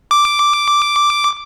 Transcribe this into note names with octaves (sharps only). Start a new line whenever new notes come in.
D6